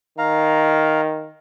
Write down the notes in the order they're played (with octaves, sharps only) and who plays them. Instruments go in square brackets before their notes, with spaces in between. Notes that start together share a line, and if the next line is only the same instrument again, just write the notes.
[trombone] D#3 [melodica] F5 A#5